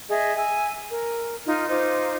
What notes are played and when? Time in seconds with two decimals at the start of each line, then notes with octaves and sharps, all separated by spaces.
0.10 G#4 D#5 E5
0.35 G#5 E6
0.91 A#4
1.47 D#4 F4 F6
1.70 D#4 F4 C5 D6